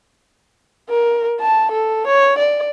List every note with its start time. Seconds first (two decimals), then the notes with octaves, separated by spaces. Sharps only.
0.89 A#4
1.41 A5
1.71 A4
2.07 C#5
2.39 D5